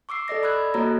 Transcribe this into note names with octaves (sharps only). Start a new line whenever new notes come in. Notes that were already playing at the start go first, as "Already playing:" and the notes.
C#6 D6 E6 C7
A4 D5 D#5 A#6
B5 E6 F#6 G#6
A#3 F#4 A4 C#5 D#5 A#5